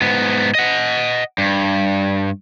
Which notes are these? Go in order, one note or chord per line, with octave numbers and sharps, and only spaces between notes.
G#2 B3
D#5 F#5
G2